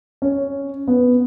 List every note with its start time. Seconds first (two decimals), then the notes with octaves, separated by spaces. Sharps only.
0.22 C#4
0.87 B3